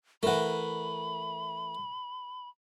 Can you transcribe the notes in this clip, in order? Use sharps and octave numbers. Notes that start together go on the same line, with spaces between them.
E3 A3 A#4 F#5 B5